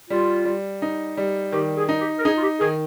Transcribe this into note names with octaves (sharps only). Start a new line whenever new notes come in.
G3 F4
G3
D#4
G3
D#3 G4
G#4
D#4
G4
A#4
D#4 G#4
F4
G4
D#3 G#4